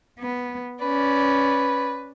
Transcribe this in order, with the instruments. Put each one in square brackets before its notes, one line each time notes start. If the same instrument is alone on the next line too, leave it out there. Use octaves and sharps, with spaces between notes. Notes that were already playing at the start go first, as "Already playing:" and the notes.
[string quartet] B3
[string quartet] C#4 D5 [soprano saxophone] B4